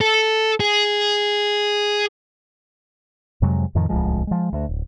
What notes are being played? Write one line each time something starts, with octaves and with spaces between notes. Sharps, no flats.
A4
G#4
F2 C3 F#3 G#3
F2 A2 D#3 F3
D1 C2 F3 G#3
F3 G#3
D2
D1